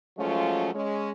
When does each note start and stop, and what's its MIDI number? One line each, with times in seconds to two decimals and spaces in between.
0.17 0.69 53
0.17 0.69 54
0.17 0.69 56
0.17 0.69 57
0.17 0.69 61
0.17 0.69 65
0.74 1.10 56
0.74 1.10 61